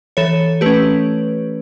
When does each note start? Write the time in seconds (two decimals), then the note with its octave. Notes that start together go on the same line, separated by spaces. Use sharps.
0.17 E3 A4 C#5
0.61 A3 C#4 G4 B4